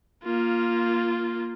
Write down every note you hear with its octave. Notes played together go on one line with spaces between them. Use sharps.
A#3 F4